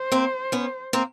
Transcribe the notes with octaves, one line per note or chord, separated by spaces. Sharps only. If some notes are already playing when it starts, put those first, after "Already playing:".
Already playing: C5
A#3 C4
B3 C#4
A#3 C4